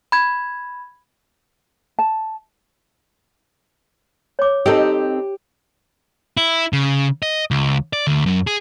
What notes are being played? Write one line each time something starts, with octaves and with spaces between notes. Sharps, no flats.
B5 G#6
A5
C#5 D6
C4 D#4 G4 A4
E4
C#3
D#5
C#2
D5
D2
F#2
G#4